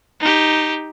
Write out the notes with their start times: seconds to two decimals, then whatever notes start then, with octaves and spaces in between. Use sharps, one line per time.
0.20 D#4 G4